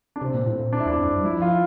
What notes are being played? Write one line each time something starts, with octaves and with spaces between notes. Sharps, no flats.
D4
C3 C4
A#2
A2
A#2
D4
E4
E2 D4
F2
G2
F3 E4
F4